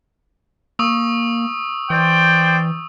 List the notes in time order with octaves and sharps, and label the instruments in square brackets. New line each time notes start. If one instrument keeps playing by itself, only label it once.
[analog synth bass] A#3 [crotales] C#6 D#6 E6
[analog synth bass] E3 [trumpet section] C5 D5 G5